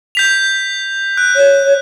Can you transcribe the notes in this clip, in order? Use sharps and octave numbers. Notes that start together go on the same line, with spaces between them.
G6 B6 F7
F#6
C#5